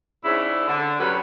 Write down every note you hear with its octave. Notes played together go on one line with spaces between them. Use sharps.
G#2 C#3 C4 D4 E4
D3
F#2 C3 F#3 G3 C#4 B4